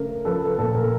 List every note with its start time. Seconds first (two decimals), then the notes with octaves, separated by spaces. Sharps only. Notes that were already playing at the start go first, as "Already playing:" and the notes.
Already playing: C#3 A3 A#4
0.25 F3 A4 B4
0.43 A4
0.58 A#2 A4
0.75 A#4